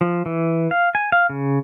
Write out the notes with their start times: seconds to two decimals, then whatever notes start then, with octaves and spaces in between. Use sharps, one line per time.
0.01 F3
0.26 E3
0.71 F5
0.95 G#5
1.12 F5
1.30 C#3